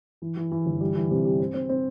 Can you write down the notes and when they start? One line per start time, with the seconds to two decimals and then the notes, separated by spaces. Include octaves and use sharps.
0.22 E3
0.37 E3
0.52 E3
0.66 G1
0.81 G3
0.95 E3
1.10 C3
1.25 G3
1.40 C4
1.54 C4
1.69 C4